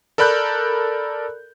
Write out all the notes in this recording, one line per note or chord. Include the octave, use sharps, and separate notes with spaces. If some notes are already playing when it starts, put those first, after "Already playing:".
A4 A#4 D5 B5 F#6 G6